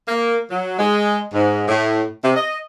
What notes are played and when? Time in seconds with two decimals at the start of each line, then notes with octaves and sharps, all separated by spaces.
0.08 A#3
0.50 F#3
0.79 G#3
1.33 G#2
1.68 A2
2.24 C3
2.36 D#5